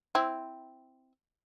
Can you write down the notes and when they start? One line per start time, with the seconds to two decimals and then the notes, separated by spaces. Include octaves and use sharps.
0.15 C4 E4